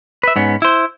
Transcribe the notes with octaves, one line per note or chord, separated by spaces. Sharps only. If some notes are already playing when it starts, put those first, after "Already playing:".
B4 E5
G#2 B3 C#4
E4 C5